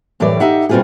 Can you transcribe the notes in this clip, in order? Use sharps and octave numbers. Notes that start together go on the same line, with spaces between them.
F#2 A2 E3 G3 C#5 D5
D#4 G4 E5 F#5
B2 G3 C4 F4 F#4 G#4